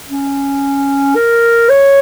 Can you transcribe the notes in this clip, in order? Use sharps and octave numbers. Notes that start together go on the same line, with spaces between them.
C#4
A#4
C#5